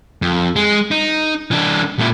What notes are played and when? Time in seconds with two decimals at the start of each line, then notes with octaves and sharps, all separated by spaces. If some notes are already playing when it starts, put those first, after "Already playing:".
0.22 F2
0.56 G#3
0.91 D#4
1.51 E3 D4
1.99 A#2 E4